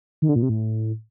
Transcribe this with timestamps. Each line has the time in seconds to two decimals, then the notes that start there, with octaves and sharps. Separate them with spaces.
0.22 D#3
0.29 D3
0.36 A#2
0.43 C3
0.49 A2